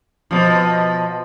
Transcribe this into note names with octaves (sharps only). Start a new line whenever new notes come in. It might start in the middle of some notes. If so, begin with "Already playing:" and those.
B2 F3